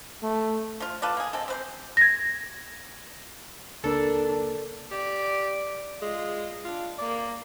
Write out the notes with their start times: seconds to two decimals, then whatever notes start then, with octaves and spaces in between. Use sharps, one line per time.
0.23 A3
0.80 F3 F4
1.02 F4 A4 B4 D5
1.17 A#3 G#4
1.33 G#3 C4 A4
1.48 C4 B4 C5
1.97 G#6 A#6
3.84 C#2 A#3 D4 A4 A#4
4.91 G4 D5
6.02 G#3 F4
6.65 D4 F4
6.98 A#3 D5